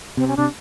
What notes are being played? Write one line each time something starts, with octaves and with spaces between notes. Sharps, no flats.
C3 C4
C#4
C3 D4